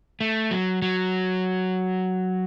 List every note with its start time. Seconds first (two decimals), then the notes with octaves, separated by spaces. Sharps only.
0.21 A3
0.51 F#3
0.82 F#3